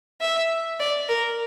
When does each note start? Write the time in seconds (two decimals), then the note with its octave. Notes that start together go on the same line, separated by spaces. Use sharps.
0.21 E5
0.80 D5
1.09 A#4